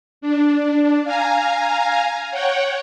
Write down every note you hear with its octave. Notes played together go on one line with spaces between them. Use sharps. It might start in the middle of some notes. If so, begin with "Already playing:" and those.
D4
F5 G#5 A#5
C#5 F#5 G5